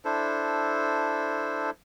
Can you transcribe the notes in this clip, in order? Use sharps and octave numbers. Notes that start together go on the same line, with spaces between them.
D4 E4 A4 C5